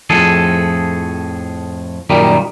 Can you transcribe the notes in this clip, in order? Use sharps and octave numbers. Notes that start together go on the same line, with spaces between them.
F2 A2 F3 G#4 A4
F#2 A#2 D#3 G3